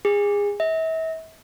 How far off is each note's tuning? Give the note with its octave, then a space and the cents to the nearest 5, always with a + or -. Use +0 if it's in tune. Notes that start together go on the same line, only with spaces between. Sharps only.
G#4 -25
E5 -35